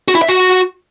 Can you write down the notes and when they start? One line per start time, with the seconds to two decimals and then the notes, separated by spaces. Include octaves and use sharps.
0.08 F#4
0.15 E4
0.22 E5
0.28 F#4